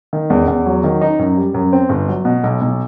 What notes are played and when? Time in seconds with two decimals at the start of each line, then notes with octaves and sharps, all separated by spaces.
0.13 D#3
0.30 E2
0.48 E2
0.66 F#3
0.84 D#3
1.01 D#4
1.19 F#2
1.37 G3
1.54 F#2
1.73 C4
1.89 G1
2.08 F#3
2.25 B2
2.44 B1
2.61 B1